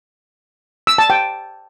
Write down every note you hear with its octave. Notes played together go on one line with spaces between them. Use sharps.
E6
A5
G5